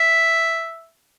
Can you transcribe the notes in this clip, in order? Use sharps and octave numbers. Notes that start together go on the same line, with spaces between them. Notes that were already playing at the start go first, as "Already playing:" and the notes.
Already playing: E5